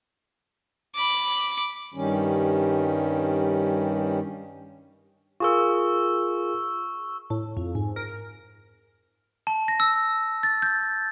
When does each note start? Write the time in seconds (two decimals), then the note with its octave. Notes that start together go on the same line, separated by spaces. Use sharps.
0.95 B5 D6
1.94 G2 D#3 G3 C#4
5.40 F4 G#4 A#4 C#6 E6
7.30 A2
7.57 F2
7.75 G#2
7.96 A#4
9.47 A5
9.68 A#6
9.80 E6
10.43 A6
10.62 G6